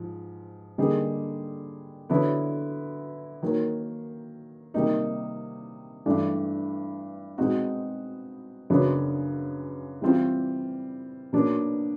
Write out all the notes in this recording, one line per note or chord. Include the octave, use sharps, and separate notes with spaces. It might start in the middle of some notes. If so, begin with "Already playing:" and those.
Already playing: G#2 F3
D3 G3 A#3 D#4 G#4
D3 F#3 B3 E4
D#3 F#3 A#3
C3 D#3 G3 A#3 D#4
G2 E3 A3 D4
B2 G#3 C4 D#4 F#4
F#2 C#3 F#3 B3 D4
E3 G3 C4 F4
B2 F#3 A#3 D4